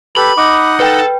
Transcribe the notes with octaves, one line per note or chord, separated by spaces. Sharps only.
G4 A4 B4 B5
D#4 D#5 F#5 D6
A4 B4 G5